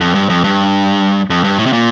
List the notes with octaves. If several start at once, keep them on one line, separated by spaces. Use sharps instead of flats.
F2
G2
F2
G2
F2
G2
A2
C3
A#2